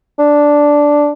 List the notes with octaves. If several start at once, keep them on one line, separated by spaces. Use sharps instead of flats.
D4